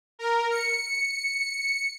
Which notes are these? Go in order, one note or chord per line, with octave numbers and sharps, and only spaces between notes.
A#4
C#7